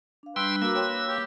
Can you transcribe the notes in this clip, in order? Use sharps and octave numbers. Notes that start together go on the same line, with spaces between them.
D4 F5
G3 D4 B4 G5 C6 E6
A#3 F#4 A#4 E6
C#5 G5 C6
G4